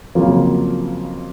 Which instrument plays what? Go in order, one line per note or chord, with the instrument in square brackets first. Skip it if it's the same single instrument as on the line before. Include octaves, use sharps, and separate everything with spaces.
[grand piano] F2 C#3 F#3 A#3 F4